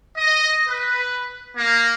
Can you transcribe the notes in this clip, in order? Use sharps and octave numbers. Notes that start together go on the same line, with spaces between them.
D#5
B4
A#3